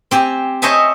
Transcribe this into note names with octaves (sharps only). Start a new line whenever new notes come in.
C4 G4 G#5
C5 C#5 D#5 E5 G#5 A5